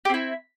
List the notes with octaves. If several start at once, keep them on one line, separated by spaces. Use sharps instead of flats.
C4 E4 G4